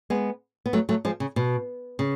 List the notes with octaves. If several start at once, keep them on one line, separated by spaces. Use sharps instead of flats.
G#3 B3
B3
F#3 A3
F#3 A3
F3 G#3
C#3
B2
C#3